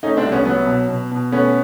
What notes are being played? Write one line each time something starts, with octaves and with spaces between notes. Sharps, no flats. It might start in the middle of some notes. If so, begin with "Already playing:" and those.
A3 C#4 D#4
C4 D4
C2
B3 C#4
F#3 B3
B2
B2
B2
A3 B3 C#4